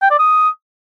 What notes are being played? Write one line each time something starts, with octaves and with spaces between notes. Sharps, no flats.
G5
D5
D#6